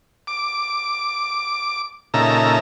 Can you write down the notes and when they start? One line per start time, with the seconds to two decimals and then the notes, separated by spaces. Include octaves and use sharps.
0.27 D6
2.14 A#2 C#3 D#4 A4 E5 A#5